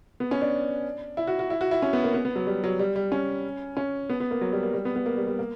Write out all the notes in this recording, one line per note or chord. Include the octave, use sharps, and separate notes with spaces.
B3
C#4
D4
E4
F#4
F#4
E4
F#4
E4
C#4
B3
A#3
B3
B3
F#3
G3
F#3
G3
G3
C#4
C#4
B3
B3
A#3
F#3
G3
A#3
G3
B3
B3
A#3
G3
G3
A#3